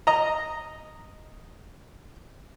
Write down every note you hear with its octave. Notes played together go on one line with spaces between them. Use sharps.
D#5 A#5